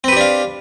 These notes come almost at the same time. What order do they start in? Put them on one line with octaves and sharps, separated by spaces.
C4 B4 G4 D4 F5